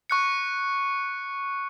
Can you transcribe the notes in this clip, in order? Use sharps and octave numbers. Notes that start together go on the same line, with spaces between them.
C#6 F#6 C#7